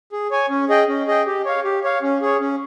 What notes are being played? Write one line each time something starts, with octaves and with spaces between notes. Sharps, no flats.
G#4
C#5 G#5
C#4
G#4 D#5 G5
C#4
G#4 D#5 G5
G4
C#5 F5
G4
C#5 F5
C#4
G#4 C#5
C#4